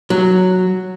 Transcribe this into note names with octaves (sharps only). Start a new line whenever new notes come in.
F#3